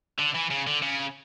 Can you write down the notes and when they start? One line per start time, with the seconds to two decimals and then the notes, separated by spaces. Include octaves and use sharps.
0.18 D3
0.34 E3
0.50 C#3
0.67 D3
0.83 C#3